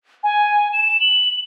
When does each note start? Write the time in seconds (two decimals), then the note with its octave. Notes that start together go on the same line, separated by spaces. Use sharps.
0.23 G#5
0.73 E7
1.01 F#7